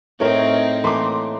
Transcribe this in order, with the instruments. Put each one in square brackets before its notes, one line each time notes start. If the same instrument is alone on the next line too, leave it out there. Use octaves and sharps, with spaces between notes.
[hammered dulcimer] A2 C#6 [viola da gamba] C4 D#4 [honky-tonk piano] A#4 C#5
[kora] E3 A3 A#3 [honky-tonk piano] C6 D6